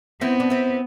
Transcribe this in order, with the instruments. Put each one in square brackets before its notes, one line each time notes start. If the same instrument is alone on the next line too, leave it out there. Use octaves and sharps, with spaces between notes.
[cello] B3 [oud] C4 E4
[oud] D4
C4 E4